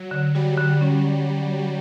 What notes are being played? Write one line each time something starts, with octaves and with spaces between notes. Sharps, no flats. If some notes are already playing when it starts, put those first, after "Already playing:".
Already playing: F#3
D3
G3 F#4
D3
C#4